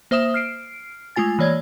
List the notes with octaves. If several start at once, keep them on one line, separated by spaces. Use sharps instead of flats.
A#3 C5 E5 D#6 E7
F6 C7 D7
G#3 A3 F4 G#5 A6
E3 A#3 C#5 D5 G#6